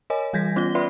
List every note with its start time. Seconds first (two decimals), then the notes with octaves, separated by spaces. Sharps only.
0.10 A#4 C#5 D#5 G#5
0.33 E3 G3 G6 G#6 A#6 B6
0.56 B3 C#4 F4 A#6 G7
0.75 F4 B4 D5 E5 B5 C6